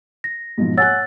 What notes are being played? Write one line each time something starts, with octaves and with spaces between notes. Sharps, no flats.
A#6
G#2 B2 F3
C#5 F#5 G#5 E6 F#6 A6